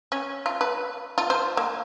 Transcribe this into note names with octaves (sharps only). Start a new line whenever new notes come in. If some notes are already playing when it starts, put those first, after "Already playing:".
C#4
F4
B4
F4
C5
A#3